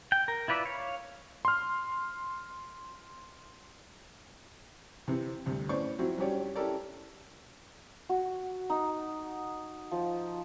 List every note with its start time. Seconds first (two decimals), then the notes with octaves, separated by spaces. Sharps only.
0.12 G5
0.28 A#4
0.48 E4 F4 B4 D5 E5
0.65 C#5 F5
1.45 C6 F6
5.08 C3 E3 C4
5.46 D2 G2 C3
5.69 A2 B3 C#4 C5 D5 C#6
5.99 F3 F#3 C4 E4 F#4
6.18 G2 F#3 C#4 G4 C#5 D5
6.56 C#4 E4 G4 A4 A#4 D5
8.09 F#4
8.70 D#4
9.92 F3